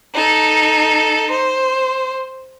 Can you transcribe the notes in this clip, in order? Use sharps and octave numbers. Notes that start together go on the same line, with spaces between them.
D#4 A4
C5